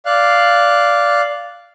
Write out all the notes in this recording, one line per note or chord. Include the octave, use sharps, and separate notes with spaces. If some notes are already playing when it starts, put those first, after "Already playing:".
D5 F5 F#6